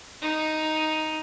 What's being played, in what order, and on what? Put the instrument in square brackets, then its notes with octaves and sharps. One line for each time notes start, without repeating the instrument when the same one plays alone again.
[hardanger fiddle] D#4